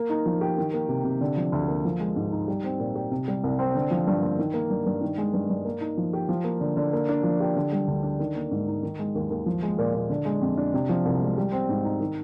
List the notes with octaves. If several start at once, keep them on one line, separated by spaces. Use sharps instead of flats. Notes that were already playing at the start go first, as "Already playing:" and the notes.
Already playing: A#3
D#4
F3
G4
D#3
A#3
C3
C3
D3
F3
D2
A#3
F3
G#3
G#2
D#4
G3
C4
A#2
G4
C3
G3
C2
C4
D3
F3
G2
A#3
D#3
A#3
G2
G2
D#3
G#3
G2
G2
A#3
D#4
F3
G4
F3
A#3
D3
D3
A#3
D4
F3
G4
D3
G3
D2
D4
D#3
A#3
G#2
D#4
D#3
G#3
D#2
D#2
F3
G#3
A#2
A#2
D3
G#3
F2
D4
C3
F3
C2
G#3
G3
C4
G#2
D#4
D#3